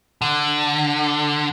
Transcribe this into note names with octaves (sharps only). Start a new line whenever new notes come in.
D3